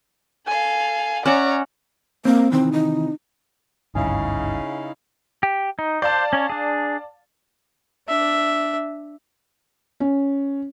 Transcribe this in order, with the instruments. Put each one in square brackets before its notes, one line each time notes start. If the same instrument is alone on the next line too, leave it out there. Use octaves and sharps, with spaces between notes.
[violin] A4 F5 [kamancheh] G#5
[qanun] C#4 E5 F#5 [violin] C#5 A#5 [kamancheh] D5
[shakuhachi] A#3 [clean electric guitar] C4
[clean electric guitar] C3 D#3 E3 [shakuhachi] C4
[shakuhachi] D#4
[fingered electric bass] G#1 D2 G2 [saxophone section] C#3 [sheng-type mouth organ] D#4 E4 F5 [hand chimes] G#5
[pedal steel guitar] G4
D#4
[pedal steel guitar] C5 [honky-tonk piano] D5 F5 A5
[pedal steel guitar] C#4 C#5
D4 G#4
[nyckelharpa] D4 E5
[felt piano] C#4